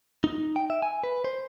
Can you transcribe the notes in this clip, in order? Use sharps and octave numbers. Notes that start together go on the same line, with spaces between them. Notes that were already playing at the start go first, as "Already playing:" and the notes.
D#4
G5
E5
G#5
B4
C5